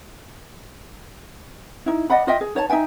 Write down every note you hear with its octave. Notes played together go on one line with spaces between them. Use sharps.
D#4 E4
D5 D#5 F#5 B5
F4 D#5 E5 G5
G#4
D#4 C#5 D5 A5
D#4 E5 G5 G#5